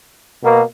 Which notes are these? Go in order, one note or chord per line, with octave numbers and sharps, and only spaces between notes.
B2 A#3